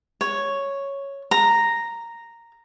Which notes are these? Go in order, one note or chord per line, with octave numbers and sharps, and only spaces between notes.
C#5
A#5